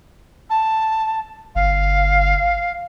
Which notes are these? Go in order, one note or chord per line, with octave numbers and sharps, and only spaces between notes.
A5
G1 F5